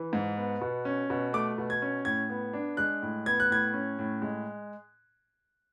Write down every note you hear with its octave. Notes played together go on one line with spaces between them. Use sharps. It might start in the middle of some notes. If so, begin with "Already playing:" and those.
Already playing: E3
G#2
B3
B2
C#4
B2
A3 D6
B2
G#6
C#4
A2 G#6
B3
D4
G#3 F#6
A2
B3 G#6
F#6
A2 G#6
C#4
A2
G#3